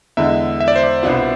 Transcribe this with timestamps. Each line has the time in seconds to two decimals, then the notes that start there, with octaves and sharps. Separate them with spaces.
0.17 E2 D3 G#3 E5
0.60 E5
0.68 D5
0.76 C5
0.84 D5
1.03 C2 B2 B3 D4 F4